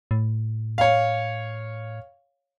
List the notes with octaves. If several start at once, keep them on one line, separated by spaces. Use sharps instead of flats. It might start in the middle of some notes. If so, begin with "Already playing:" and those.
A2
C#5 F5